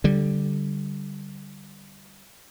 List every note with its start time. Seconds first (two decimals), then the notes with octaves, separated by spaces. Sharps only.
0.04 D3 G3